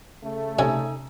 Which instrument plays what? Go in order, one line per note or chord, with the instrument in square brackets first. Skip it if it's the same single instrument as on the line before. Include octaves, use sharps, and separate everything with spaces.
[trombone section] C#3 A3
[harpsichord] C3 C#4 [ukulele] D#4 A4 G#5